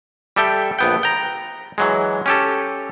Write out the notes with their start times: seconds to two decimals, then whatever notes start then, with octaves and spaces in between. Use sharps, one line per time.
0.36 G3 G4 A4 E5 G5
0.79 A#1 B3 G5
1.03 G5 A#5
1.78 E3 F#3 G#3
2.26 C#4 G4 A4